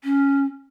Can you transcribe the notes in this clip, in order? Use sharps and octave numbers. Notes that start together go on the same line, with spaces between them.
C#4